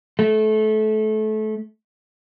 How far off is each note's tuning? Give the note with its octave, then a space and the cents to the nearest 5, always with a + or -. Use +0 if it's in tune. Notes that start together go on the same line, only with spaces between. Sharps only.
A3 -25